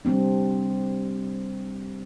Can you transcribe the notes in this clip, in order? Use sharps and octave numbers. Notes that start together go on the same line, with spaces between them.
G3 C4 D4